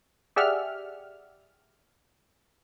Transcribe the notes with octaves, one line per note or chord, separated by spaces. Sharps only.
G4 G#4 D5 E5 F#5 F6